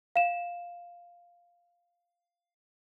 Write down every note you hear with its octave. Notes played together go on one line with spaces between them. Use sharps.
F5 E7